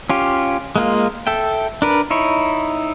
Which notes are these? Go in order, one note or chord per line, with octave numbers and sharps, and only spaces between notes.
C#4 F4 G4
G#3 A#3 F4
A4 E5 G5
D4 A#4 B4
D#4 E4 C#5